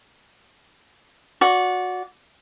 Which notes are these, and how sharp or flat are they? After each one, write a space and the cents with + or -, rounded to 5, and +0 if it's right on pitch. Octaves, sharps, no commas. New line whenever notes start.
F#4 -20 D5 -25